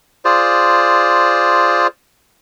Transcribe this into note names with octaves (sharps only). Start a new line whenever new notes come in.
F4 G#4 C5 D5